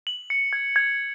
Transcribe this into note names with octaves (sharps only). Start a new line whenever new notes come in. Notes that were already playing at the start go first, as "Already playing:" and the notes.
F#7
C#7
G#6
G#6